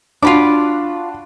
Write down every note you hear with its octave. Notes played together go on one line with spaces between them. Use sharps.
D4 F4 F#4 B5 D6